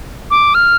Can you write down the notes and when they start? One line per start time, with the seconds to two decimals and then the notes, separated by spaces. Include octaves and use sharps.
0.31 D6
0.55 F6